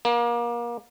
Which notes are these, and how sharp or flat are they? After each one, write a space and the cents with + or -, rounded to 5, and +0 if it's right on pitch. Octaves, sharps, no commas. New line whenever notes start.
A#3 +30